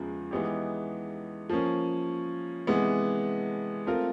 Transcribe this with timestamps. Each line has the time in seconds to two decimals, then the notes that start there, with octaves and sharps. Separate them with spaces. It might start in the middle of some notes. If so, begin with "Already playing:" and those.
Already playing: E2 C#3 F3 G#3
0.31 E3 G#3 B3 D#4 G4
1.50 F3 A#3 C#4
2.67 C3 E3 G#3 B3
3.86 A3 C4 F4 A#4